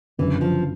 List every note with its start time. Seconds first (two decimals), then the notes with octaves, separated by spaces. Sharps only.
0.18 G1 F#2 C#3 E3
0.41 F3